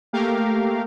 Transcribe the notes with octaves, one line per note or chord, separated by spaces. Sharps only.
A3 A#3 G4 A#4 F5